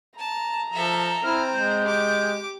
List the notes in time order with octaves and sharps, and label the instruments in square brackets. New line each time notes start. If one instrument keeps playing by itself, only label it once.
[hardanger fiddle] A5 [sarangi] A#5
[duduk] F3 [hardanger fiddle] A4 E5
[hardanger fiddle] C4 C5 [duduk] E4 [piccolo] F6
[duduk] G#3 [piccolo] G6
[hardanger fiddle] G4 D6